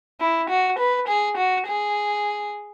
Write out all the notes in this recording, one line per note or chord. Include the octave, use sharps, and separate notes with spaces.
E4
F#4
B4
G#4
F#4
G#4